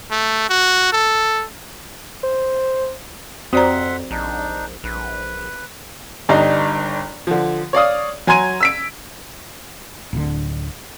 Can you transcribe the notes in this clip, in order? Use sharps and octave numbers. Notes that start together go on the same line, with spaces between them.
A3
F#4
A4
C5
F2 C4 F#4 D5 E5 F#5 A#5 C6
A#1 D4 D#4
A#1 B4
G1 G2 D4 D#4
D3 F3
C#5 D5 F5 D#6
F#3 G#5 A#5 C6 G#6 D#7
E6 B6 D7
D1 D3